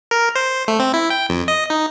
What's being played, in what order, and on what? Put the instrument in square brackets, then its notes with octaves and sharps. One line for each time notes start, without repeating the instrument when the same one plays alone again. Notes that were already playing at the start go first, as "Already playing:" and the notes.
[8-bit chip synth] A#4
C5
A3
C4
E4
G5
F2
D#5
D#4